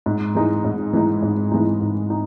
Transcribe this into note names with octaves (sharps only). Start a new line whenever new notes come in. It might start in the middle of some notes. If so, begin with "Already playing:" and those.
G#2
E3 G#3 D#4
G#2
E3 G#3 D#4
G#2
E3 G#3 D#4
G#2
D#4